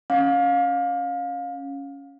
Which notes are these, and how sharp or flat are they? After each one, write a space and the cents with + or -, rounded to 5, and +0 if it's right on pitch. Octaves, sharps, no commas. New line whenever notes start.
C#4 +0 F5 +25